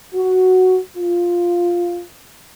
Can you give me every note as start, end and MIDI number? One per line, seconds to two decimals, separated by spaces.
0.15 0.78 66
0.97 2.01 65